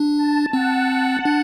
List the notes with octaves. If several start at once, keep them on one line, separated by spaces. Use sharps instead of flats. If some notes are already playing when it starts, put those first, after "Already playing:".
Already playing: D4
A5
C4 F#5
D4